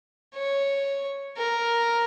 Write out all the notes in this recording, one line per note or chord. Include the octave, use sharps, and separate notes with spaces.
C#5
A#4